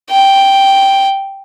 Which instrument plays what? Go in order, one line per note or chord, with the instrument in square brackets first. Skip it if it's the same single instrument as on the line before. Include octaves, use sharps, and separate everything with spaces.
[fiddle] G5